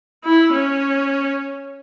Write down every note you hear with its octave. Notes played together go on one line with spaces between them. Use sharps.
E4
C#4